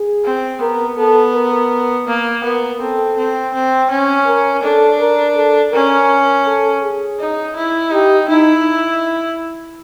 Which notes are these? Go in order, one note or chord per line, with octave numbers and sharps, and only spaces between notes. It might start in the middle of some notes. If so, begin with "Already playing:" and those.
Already playing: G#4
C4
B3 A#4
B3 A4
A#4
A#3
B3 A#4
C4 A4
C4
C4
C#4
A#4
D4 A4
A#4
A4
C#4 A#4
A4
G#4
D#4
E4
D#4 G4
D#4 E4